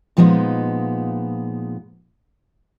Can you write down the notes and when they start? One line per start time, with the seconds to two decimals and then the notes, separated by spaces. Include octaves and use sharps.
0.17 A#2 F3 G3 G#3 B3 D#4